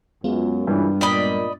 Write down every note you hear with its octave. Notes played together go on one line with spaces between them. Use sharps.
F#2 G#3 B3 F4
G2 A#2 C#3 E3
A#2 D5 D#5 B5